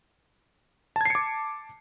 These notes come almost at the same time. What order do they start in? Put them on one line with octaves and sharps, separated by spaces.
A5 G#6 C7 C#7 D6